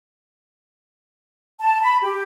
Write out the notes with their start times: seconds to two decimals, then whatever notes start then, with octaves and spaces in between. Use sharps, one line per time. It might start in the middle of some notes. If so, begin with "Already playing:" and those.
1.61 A5
1.83 B5
2.03 G4